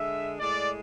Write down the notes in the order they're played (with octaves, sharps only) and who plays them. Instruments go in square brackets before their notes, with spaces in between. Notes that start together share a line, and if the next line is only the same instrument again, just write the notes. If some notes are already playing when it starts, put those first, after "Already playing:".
Already playing: [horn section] D3 G#3 E5
A2 G#3 D5